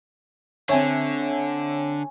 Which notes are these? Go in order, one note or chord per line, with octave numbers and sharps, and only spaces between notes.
D3 C4 C#5 E5 G#5